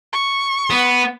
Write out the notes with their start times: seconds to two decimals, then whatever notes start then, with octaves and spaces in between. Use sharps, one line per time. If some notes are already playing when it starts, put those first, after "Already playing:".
0.13 C#6
0.70 B3